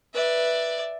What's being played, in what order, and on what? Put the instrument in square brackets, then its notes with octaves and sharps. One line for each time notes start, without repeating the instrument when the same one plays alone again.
[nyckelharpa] B4 [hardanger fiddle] D5 E5